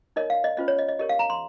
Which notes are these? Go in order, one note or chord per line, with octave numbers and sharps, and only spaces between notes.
D#4 A#4 C#5 D#5
F5
D#5
C#4 F4 C5 D#5
C#5
D#5
D#5
G4 A#4 C#5 D#5
F5
A#5
C6